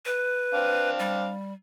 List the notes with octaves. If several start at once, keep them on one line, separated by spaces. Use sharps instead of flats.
B4
C4 D4 F5
G3